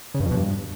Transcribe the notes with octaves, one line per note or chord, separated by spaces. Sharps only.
C#3
G2
F2
B2
G2